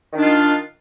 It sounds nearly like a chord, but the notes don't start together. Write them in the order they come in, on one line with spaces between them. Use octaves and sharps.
D#3 D4 F4